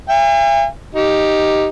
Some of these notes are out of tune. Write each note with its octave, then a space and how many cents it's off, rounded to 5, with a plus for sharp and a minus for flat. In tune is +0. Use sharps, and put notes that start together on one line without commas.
E5 +45 G#5 -45
D#4 +0 G4 +0